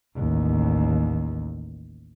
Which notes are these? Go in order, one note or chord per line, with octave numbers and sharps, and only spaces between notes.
A1 D#2